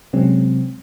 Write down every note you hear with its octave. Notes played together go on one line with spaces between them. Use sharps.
C3 F#3 G#3 C4 C#4